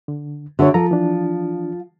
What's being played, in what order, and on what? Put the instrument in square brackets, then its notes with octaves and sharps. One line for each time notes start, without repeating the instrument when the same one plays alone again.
[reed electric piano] D3
[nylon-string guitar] D3 C#5 [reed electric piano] F#4 E5
[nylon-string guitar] F3 [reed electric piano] A4 A#5
[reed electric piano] E3 D4